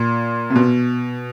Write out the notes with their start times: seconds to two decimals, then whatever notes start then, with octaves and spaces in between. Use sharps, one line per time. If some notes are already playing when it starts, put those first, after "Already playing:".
Already playing: A#2
0.50 C3
0.56 B2